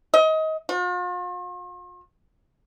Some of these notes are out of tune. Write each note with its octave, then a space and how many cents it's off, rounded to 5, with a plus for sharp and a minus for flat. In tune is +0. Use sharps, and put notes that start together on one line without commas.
D#5 +25
F4 +45